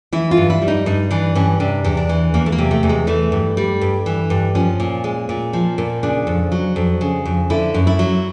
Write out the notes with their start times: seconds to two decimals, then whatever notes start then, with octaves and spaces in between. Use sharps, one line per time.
0.12 E3 E4
0.31 F4
0.37 G2
0.50 E4
0.62 G3
0.68 D#4
0.86 G2 D#4
1.11 E3 D4
1.35 G2 C#4
1.60 C3 D4
1.84 E2
1.97 D4
2.09 E3
2.34 E2 A#3
2.46 A3
2.52 A#3
2.58 C3
2.71 A3
2.83 E2
2.89 G#3
3.07 E3 A3
3.32 G2
3.57 G3
3.81 G2
4.06 E3
4.30 G2
4.55 F3 C#4
4.80 A#2
5.04 G#3
5.29 A#2
5.53 F3
5.78 A#2
6.03 C#3 D4
6.27 F2
6.52 F#3
6.76 F2
7.01 C#3
7.25 F2
7.50 D3 E4
7.74 F#2
7.87 E4
7.99 F#3